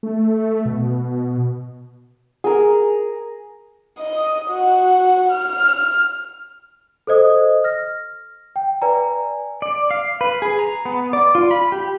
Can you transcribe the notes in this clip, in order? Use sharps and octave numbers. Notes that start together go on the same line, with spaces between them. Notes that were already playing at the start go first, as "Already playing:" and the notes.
A3
B2
G#4 A#4
D#5
F#4
F6
A4 C5 D#5 D#6
F6 A#6
G5
B4 D5 G#5 A#5
D5
F5
B4
G#4
A#5
B3
D5
F4
B5
G4